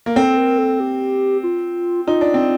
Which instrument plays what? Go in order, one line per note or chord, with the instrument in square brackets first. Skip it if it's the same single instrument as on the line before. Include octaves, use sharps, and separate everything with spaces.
[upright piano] A#3
[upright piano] C4 [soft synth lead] A4
[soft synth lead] A#4
A4
G4
F4
[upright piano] D#4 [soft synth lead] F4
[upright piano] D4
C4